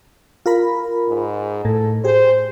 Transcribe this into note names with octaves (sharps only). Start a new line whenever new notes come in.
F4 A#4 B5
G#2
A2 A4
G4 G#4 C5